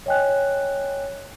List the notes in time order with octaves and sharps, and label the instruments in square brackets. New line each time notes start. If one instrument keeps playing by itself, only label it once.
[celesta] C#5 D#5 G5 G#5 F#6